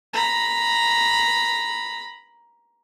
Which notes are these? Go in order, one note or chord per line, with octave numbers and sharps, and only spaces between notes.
A#5 B5